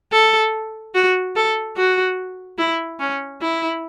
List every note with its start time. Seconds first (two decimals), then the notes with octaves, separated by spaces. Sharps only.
0.12 A4
0.95 F#4
1.36 A4
1.77 F#4
2.58 E4
3.00 C#4
3.41 E4